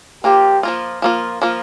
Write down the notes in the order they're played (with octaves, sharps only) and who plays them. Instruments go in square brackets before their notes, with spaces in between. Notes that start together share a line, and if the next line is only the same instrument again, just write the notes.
[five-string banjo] F3 A#3 F4 [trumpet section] G4
[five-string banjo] F3 A#3 F4
F3 A#3 F4
F3 A#3 F4